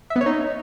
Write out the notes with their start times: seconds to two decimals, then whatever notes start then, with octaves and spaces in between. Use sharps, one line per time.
0.10 E5
0.16 B3
0.21 C#5
0.26 D#4